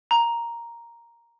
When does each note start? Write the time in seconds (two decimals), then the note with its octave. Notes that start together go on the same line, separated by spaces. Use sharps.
0.11 A#5